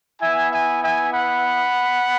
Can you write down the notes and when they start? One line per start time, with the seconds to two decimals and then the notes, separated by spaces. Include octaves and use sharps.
0.21 B3 E4 E5 G#5
0.52 E5 G#5
0.83 E5 G#5
1.13 F#5 B5